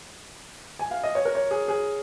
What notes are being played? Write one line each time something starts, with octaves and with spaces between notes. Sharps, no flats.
G#5
F5
D#5
C#5
A#4
C#5
G#4
G#4